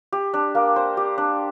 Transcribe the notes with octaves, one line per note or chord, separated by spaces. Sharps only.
G4
D4
A#3
C5
G4
D4